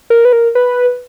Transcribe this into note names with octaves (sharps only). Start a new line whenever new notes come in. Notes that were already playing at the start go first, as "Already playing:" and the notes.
A#4
B4
A#4
B4